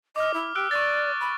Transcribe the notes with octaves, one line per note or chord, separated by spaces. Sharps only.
D#5 D6 F6
E4
G4 E6 F#6 D7
D5 C#6 A6
B5